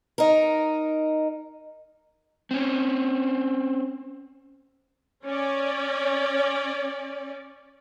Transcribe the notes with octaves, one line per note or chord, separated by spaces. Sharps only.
D#4 A#4
C4 C#4
C#4 D5